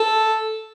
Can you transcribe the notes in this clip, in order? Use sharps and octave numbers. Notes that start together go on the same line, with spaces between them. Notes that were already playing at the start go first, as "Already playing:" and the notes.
Already playing: A4